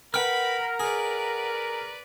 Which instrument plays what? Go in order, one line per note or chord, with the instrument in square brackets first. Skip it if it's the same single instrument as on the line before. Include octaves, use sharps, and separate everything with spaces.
[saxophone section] A#4 [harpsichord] B4 [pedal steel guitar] F#5 G5 F6 [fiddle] B5
[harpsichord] G#4 [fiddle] B4 D5